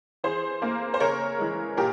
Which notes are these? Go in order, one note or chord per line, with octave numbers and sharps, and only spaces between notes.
E3 G#4 C5
A#3
C5
C#3 A#4 C#5
E3 G#3
A#2 G4 A#4